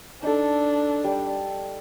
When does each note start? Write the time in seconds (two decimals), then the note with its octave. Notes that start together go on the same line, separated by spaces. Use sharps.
0.23 D4 D#4 A4
1.04 G3